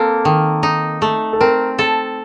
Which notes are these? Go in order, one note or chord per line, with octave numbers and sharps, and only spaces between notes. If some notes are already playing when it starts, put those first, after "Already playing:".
Already playing: A#3 C4 A4
D#3
D#4
A3
A4
C4 A#4
A4 A5